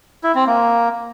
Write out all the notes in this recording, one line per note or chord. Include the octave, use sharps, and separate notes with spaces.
E4
C4
A#3